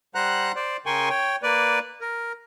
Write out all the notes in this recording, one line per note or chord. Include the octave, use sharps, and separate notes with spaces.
G3 C5 F#5 A#5 F#6
C5 D5
C#3 A#4 G5 G#5 C6 C#6
C#5 G5
A#3 B4 D5
A#4